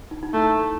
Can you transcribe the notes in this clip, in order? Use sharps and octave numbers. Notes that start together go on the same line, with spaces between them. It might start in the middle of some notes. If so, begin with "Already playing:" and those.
D#4
D#4
A3 E4